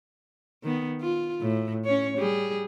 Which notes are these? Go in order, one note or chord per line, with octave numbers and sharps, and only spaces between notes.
D#3 B3
F4
A2
C#4 C#5
G3 G#4